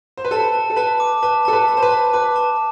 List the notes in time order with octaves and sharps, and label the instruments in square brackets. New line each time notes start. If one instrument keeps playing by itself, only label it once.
[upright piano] C5
B4
[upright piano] A4 [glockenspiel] A5
[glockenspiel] A5
[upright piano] A4
[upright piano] B4 [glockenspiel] A5
[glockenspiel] D6
[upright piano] B4 [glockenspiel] A5
[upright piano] A4 [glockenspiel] A5
[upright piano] B4
[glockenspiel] A5
[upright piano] C5
B4
[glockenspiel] A5
[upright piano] B4 [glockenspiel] D6
[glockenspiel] A5